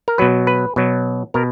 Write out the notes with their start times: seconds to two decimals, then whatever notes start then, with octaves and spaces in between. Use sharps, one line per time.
0.08 A#4
0.18 B2 F#3 B4
0.47 B4
0.76 B2 F#3
1.34 B2 A#4